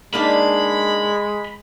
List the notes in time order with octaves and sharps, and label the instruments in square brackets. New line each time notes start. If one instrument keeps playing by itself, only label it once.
[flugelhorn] G#3 [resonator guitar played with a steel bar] A#3 D4 D#4 [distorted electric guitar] B5